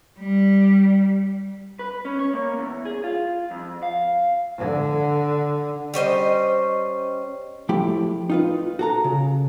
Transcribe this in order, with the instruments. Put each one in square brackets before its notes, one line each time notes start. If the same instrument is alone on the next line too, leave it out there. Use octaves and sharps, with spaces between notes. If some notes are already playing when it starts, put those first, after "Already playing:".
[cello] G3
[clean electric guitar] B4
C#4
C#5
A#3
E2
G#4
F4
F2
F5
[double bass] D3
[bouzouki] G3 C#4 C5 D#5
[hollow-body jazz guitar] F3 A3 E4 G4
D#4 F4 B4
F#4 A4 A#5
C#3